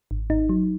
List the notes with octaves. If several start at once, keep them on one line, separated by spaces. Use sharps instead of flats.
G#1
G#1 D#4
F#3